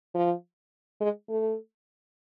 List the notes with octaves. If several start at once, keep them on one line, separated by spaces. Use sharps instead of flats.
F3
G#3
A3